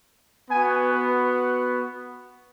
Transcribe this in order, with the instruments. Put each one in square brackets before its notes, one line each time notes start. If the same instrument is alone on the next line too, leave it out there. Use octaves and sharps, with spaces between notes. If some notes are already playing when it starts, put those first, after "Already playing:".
[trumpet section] B3 F#4 G#5
B4